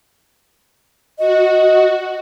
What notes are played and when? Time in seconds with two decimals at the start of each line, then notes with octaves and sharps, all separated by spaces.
1.19 F#4 D#5